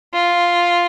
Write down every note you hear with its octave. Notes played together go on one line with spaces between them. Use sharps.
F4